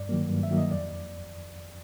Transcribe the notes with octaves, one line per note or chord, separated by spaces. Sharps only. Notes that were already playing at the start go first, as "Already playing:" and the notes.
Already playing: G2 D5
D#3 F#3 A#3
G2
E5
D#3 F#3 A#3
D#5
F2 D5